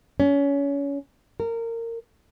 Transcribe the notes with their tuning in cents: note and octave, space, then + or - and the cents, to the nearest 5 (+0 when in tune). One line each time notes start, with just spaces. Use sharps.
C#4 +25
A#4 -20